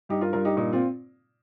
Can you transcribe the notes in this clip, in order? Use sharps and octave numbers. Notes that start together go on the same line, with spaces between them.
G2 D#4 G4
F4 A#4
G2 F4 A#4
D#4 G4
A#2 D#4
C4 F4